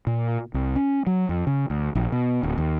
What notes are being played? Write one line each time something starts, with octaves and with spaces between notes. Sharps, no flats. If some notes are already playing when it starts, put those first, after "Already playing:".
A#2
C2
C#4
F#3
F2
C#3
D2
A#1
B2
D1
D#2